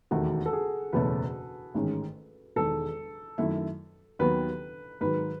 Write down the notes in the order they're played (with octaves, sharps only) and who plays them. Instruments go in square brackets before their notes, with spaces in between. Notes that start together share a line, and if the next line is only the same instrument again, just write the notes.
[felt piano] E1 D#2 D#3 A3 [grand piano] F#4
[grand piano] A4
G#4
[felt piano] F#1 E2 B2 A3 C#4 [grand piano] B4
[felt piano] A1 G#2 D#3 G#3 C#4
[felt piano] E1 E2 D#3 G#3 [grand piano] A4
[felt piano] F#2 D#3 A3 E4
[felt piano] D#2 D#3 F#3 B3 F#4 [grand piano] B4
[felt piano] G#2 D#3 F#3 [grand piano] B4